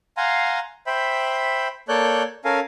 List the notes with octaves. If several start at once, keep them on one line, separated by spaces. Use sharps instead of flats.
F5 F#5 G#5 A#5 C6
C5 E5 G5 B5
A#3 A4 C#5 D5 F#6 G6
C#4 A4 A#4 F5 G#5